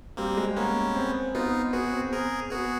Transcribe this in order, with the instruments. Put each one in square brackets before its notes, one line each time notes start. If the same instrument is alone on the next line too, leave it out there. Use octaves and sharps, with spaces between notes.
[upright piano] G3 [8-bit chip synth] A#3 C4
[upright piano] G#3
[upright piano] A#3 [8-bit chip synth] B3 C#4
[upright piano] C4
[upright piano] B3 [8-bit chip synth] D#4 F4
[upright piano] B3 [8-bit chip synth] F#4 G#4
[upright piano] C4
[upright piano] C4 [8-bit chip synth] G#4 A#4
[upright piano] B3 [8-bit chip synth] F#4 G#4